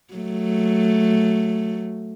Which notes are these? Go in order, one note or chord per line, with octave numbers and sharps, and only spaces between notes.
F#3 A3